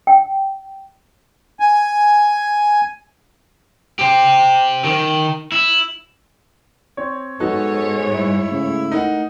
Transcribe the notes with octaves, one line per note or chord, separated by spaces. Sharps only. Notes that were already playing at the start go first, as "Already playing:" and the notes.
G5
G#5
G4 C5
D#3
E4
C4 C#5
G#2 B3 D#4 F#4 A4 C#5
G3 E4
C#3 A3
D#4 A#4 F#5